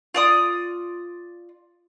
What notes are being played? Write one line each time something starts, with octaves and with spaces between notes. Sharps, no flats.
F4 D5 D#6